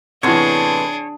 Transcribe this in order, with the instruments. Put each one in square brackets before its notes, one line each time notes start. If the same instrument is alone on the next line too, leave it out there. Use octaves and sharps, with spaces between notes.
[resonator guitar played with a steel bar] A2 B3 [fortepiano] C3 E3 [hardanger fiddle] D4 G#4 [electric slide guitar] C#5